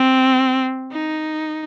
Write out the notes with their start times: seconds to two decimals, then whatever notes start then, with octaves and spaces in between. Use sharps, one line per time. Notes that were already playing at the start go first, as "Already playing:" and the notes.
Already playing: C4
0.92 D#4